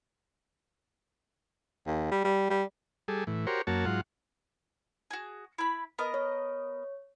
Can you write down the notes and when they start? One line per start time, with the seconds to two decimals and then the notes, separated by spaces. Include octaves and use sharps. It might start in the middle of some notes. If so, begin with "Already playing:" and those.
1.87 D#2
2.11 G3
2.24 G3
2.50 G3
3.08 G3 G#4 A4
3.27 A2 E3
3.47 F#4 G4 A#4 C5 C#5
3.67 F#2 A#3 F#4 C#5 A5
3.86 G#2 F#3 F4 F#5
5.11 F#4 G#4
5.58 E4 B5
5.98 B3 A#4 D#5
6.14 C#5